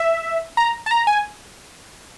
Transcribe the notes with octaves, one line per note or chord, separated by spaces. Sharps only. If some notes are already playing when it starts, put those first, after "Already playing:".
Already playing: E5
A#5
A5
A#5
G#5